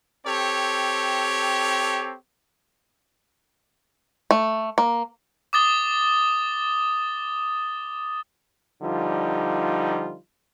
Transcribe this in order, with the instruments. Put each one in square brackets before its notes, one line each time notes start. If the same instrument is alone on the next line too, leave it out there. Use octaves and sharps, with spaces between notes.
[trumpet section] C4 G4 A4 C#5
[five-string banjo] A3
A#3
[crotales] D6 D#6 A6 G7
[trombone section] D3 F3 G3 D#4 F4